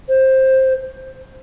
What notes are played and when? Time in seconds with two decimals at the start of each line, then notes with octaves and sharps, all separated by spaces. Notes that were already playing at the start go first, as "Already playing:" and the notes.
0.09 C5